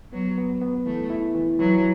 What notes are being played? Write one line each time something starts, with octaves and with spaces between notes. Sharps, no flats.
F#3 B3
B3
B3
E3 A3
E4
E3
E3 F#3